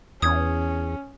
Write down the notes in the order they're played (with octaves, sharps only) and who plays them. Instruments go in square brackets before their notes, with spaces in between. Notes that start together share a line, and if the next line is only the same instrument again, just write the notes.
[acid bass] E2 [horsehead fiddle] C#4 [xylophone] D#6 G#6